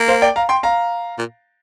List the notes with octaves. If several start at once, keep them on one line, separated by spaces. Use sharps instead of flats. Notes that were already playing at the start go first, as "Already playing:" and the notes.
Already playing: A#3
C5 F5
D5 G5
F5 A#5
G5 C6
F5 A#5
A#2